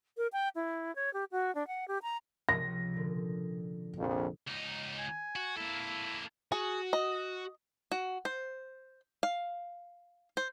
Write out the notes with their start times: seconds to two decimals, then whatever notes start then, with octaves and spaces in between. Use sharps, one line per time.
0.17 A#4
0.33 G5
0.56 E4
0.95 C#5
1.13 G4
1.32 F#4
1.55 D4
1.67 F#5
1.88 G4
2.03 A#5
2.49 C#2 C3 F3 A#6
2.94 A#2 D3
3.96 A#1 F2
4.47 C#2 D#4
4.99 G#5
5.36 F#4
5.57 A#3 E4 A4
6.52 F#4 G#4
6.93 D#5
7.92 F#4
8.25 C5
9.23 F5
10.37 C5